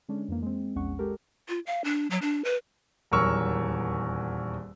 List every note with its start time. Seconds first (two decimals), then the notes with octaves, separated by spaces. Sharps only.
0.08 D3 G#3 C#4 D4
0.28 F2 E3 A#3
0.42 G#3 C4
0.75 A#1 E2 G#3 C#4 F#5 C#6
0.99 G#3 G4 A4 A#4
1.49 F4
1.67 F5
1.84 D4
2.11 F#3
2.22 D4
2.45 B4
3.11 D#1 E2 F#3 A#4 C#6 E6